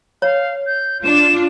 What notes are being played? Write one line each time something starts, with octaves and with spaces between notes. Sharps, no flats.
C#5 F5
G6
D4 F4 E7